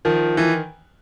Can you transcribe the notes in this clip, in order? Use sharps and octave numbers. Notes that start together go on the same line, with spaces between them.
D#3 F3
E3